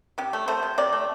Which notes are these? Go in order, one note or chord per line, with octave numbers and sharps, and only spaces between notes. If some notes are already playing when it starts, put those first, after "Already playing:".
C3 G4
A3
A3 C5
C3
C3 D5
A3